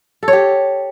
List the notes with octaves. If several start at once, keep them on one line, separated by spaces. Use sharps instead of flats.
A4
C#5
G4